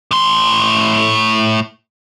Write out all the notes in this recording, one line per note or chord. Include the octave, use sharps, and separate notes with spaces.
A2 C6